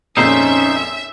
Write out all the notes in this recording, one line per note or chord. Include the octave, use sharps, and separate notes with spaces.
G#1 F2 A#2 C#4 D#4 C5 E5